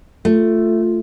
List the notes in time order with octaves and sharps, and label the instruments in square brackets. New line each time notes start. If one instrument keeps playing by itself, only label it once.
[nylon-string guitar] A3 [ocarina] F4